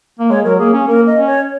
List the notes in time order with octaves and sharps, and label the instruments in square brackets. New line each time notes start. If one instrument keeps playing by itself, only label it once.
[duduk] A#3
[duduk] G#3 [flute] C#5
[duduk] F#3 [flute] A#4
[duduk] A#3 [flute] G#4
[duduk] C#4
[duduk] A#3 [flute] A#4
[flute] D#5
[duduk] C#4
[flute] C#5